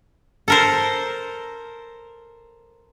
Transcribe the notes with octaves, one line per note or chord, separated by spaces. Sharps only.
A4 A#4 C5